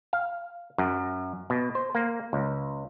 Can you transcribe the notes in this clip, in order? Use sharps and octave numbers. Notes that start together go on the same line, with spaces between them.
F5
F#2
B2
C5
A#3
C#2